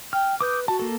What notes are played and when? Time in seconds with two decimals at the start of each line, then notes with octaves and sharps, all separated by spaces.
0.13 G5 F6
0.41 B4 D6 D#6 G6
0.68 F#4 A5
0.79 A#3 A4